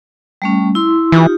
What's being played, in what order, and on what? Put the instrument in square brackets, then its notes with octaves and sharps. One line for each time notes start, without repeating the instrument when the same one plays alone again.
[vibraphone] G3 A3 C#4
E4 C6
[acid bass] E3 [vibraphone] D#4 F4 G4